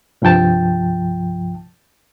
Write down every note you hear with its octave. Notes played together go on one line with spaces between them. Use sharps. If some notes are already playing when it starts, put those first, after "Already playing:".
C2 G2 F3 G5 A5